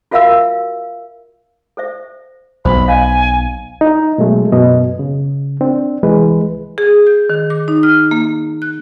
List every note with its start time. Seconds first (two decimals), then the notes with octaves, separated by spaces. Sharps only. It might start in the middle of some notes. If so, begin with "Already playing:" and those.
0.11 F4 F#4 A#4 E5 F5 E6
1.77 A4 C5 E5
2.65 B1 B2 C5 B5
2.88 C#5 D#5 F5 G#5
3.81 D#4
4.18 B2 F#3 G#3 A3
4.52 F#2 B2 D#5
4.99 C#3
5.61 C4 D4
6.03 C2 E3 G#3 B4
6.78 G#4
7.07 G6
7.30 D#3
7.50 D6
7.68 D#4
7.83 F6
8.11 A#3
8.62 F#6